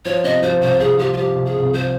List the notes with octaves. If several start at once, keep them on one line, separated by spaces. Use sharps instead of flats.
F3 C#5
C3 D#5
F3 C5
C2 C5
C2 G#4
F3 G4
F4
F3 G4
C2
G#4
C2
F3 C5